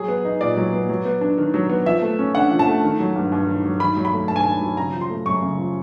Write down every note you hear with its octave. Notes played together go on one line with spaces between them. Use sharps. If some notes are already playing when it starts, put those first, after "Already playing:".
Already playing: F#3 G#4
B3
D#4
A#2 D5
F#3
B3
F#3
B3
D4
D#3
F#3
B3
F3 E5
A3
C#4
D3 F#5
F3
A5
A3
D#3
F#3
G2
G2
D#3
F#3
D#3 B5
F#3
B5
A3
G2 A5
G#5
D#3 A5
F#3
C#3 A#5
F3
C6
A3
F#2 C#6
C#3
F3